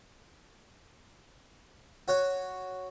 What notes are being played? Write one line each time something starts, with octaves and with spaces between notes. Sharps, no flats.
F#4 C#5 F#5